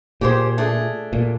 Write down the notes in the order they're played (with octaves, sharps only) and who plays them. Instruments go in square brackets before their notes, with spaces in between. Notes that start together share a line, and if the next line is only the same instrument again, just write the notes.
[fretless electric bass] A#2 [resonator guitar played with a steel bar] G4 G#4 C5
[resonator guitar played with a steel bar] A3 D4 G#4
[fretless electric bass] A#2